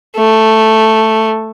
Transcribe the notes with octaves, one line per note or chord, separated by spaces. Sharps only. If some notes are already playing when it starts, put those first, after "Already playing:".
A3